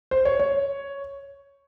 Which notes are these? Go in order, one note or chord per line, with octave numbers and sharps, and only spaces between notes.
C5
C#5
C#5